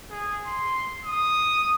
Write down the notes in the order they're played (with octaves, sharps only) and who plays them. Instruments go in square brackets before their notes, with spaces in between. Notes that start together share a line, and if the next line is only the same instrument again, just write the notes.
[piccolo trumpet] G#4
C6
D#6